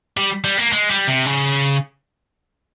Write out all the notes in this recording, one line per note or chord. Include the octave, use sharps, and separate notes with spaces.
G3
G3
A#3
G#3
G3
C3
C#3